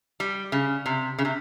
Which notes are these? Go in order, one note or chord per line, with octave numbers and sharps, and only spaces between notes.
G3
C#3
C3
C#3
C3